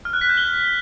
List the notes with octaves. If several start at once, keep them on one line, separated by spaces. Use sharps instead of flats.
F6
F#6
B6
G6
G7